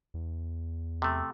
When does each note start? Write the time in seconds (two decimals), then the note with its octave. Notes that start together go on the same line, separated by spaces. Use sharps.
0.14 E2
1.02 C3 A3